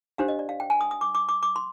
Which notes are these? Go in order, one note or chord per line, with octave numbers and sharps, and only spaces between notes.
D4 G4 C5 F5
D#5
D5
F5
G5
G#5
D#6
D#6
D6
D6
D6
D6
C6